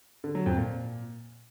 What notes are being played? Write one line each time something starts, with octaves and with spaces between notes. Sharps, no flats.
D3
F#3
F2
A#2